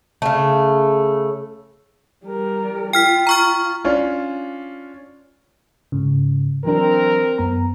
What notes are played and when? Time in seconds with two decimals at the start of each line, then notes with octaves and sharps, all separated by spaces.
0.22 C#3 A3
2.25 G3 A#4
2.93 F4 G5 F6 B6
3.27 A#5 C#6 F6
3.84 C#4 D4 F4
5.92 G#2 C#3
6.65 E3 F#3 C4 D4 A#4
7.38 F#2 B3 A#5